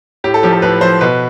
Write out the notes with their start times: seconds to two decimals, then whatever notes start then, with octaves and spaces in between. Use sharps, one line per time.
0.24 A2 G4
0.34 A4
0.43 F3 G4
0.53 A4
0.62 A2 B4
0.81 F3 C5
1.01 B2 B4